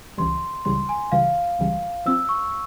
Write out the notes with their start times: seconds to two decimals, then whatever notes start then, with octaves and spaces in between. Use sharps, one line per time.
0.18 C#2 C#3 E3 G3 C6
0.65 C#2 C#3 E3 G3 C6
0.89 G#5
1.12 C#2 C#3 E3 G3 F5
1.59 C#2 C#3 E3 G3
2.06 F3 C4 F4 E6
2.29 C#6